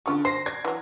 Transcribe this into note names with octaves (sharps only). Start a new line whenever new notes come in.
D3 G#3 F4 C#6
C5 A#6 C7
D5 G#6
E3 F#3